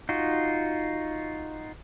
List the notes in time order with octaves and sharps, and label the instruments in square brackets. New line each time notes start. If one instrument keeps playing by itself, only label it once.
[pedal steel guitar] D#4 F4 F#4